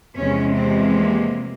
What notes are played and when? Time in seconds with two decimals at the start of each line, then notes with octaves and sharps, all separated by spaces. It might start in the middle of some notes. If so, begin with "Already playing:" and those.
0.18 E2 C3 F3 G#3 C#4
0.56 C4
0.94 A#3